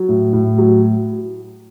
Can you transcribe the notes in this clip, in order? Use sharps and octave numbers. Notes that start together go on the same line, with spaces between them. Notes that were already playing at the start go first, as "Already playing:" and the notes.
Already playing: F#3
A2
A2
F#3